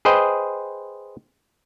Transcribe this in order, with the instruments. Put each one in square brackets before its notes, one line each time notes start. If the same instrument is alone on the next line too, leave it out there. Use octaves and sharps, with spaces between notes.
[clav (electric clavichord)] G#4 B4 C5 D#5 G5